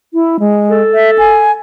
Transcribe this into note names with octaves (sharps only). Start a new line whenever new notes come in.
E4
G#3
A4
E5
G#5